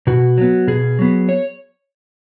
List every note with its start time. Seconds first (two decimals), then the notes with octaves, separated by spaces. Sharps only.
0.07 B2 F#4
0.38 F#3 B3
0.67 B2 G#4
0.99 F#3 B3
1.29 C#5